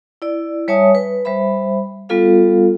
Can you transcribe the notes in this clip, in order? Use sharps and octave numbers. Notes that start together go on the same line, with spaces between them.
E4 D5
G3 C#5 E5 G#5 A5 D#6
B4
G3 C5 E5 B5
G3 B3 F4 A4 F5